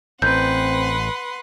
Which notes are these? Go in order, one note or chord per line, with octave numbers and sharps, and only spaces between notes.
A1 C4 B4 F#5 C6 G6